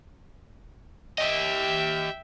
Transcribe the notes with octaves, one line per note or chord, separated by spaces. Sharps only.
G4 D#5 E5 G5